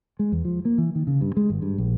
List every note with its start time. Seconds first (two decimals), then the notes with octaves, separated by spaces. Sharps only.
0.19 G#3
0.32 E2
0.45 F3
0.65 A#3
0.78 E3
0.95 D#3
1.07 C#3
1.21 G2
1.37 G#3
1.50 G#1
1.62 G2
1.78 A#1